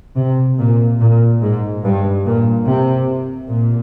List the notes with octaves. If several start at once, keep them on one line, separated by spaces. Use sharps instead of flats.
C3
A#2
A#2
G#2
G2
A#2
C3
A#2